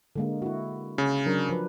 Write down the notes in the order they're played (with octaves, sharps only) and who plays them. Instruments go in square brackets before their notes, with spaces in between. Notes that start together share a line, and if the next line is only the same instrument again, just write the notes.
[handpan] D3 G#3 A#3
E4 F#4
[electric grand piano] C#3
[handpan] F#3 D4 A#4
F3 B4